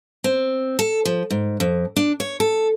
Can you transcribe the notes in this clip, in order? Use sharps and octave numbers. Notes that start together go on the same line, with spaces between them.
C4
A4
F3
G#2
F2
D4
C#5
A4